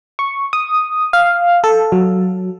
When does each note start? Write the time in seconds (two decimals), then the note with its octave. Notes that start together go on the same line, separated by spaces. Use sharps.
0.19 C#6
0.53 D#6
1.13 F5
1.64 A4
1.92 F#3